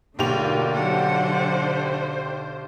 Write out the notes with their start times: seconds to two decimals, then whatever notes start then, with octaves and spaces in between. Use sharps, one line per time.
0.19 B1 D3 A3 A#3 F4 G4 F7
0.74 F#3 C5 F#5